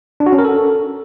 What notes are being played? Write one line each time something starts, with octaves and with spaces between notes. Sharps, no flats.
D4
F#4
C#4
A#4
A4